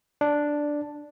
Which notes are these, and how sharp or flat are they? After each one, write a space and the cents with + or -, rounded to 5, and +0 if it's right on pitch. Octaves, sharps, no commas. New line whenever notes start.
D4 +0